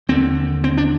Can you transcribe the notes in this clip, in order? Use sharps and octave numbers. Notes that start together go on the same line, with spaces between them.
D#2 D3 C4
C4
D4